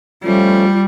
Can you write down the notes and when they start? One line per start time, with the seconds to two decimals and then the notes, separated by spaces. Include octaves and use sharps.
0.24 F3 G3 A3 C#4 F4